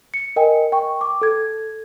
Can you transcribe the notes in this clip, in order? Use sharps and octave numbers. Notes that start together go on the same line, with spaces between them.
C#7
A#4 D#5 G5 G#5
G5 C#6
D6
A4 G#6